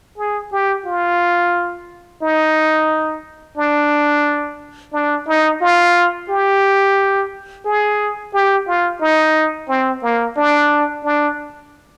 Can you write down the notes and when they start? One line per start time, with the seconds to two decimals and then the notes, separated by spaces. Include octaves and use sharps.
0.18 G#4
0.52 G4
0.86 F4
2.22 D#4
3.58 D4
4.93 D4
5.28 D#4
5.61 F4
6.29 G4
7.65 G#4
8.34 G4
8.67 F4
9.01 D#4
9.69 C4
10.03 A#3
10.37 D4
11.04 D4